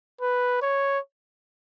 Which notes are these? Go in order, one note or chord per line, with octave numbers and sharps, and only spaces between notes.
B4
C#5